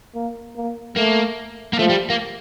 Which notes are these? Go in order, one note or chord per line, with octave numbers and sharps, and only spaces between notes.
A#3
A#3
A3 A#3
A#3
F3 A3
G3
A#3